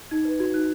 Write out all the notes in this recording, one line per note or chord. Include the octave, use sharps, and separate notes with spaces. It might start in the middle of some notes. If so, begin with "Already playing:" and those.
D#4 G#6
B4
F#4 G#6
D#4 F#6